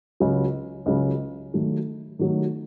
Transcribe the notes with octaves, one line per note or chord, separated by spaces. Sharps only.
C#2 C#3 F#3
C#2 C#3 F#3
D#3 F#3 A3
D#3 F#3 A3